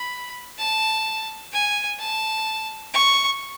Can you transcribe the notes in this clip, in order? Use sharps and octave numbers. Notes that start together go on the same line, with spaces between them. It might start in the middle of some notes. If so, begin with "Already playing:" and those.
Already playing: B5
A5
G#5
A5
C#6